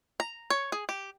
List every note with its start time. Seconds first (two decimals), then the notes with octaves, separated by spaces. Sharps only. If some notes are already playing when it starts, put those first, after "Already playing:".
0.20 A#5
0.50 C#5
0.72 G#4
0.89 G4